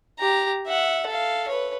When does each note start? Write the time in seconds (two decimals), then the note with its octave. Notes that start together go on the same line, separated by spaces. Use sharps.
0.19 G4 A#5
0.67 E5 F#5
1.07 A4 F5
1.48 B4 C#5